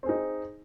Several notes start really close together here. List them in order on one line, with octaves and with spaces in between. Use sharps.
C4 G#4 D#4